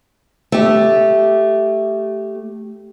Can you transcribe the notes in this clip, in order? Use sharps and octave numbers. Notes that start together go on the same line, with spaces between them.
A3 G4